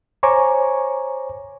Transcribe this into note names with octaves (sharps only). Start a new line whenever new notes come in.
C5 C#5 G#5 A#5 C#6 D6